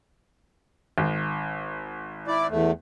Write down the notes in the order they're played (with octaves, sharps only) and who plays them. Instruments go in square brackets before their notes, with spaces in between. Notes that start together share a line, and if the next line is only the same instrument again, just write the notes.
[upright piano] G#1
[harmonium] E4 D5
E2 A3